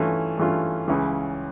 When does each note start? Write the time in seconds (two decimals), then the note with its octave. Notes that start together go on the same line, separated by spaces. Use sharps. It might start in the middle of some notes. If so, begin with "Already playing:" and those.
Already playing: G2 E3 A3 C#4 F4
0.37 G2 E3 A3 C#4 F4
0.88 C#2 C#3 E3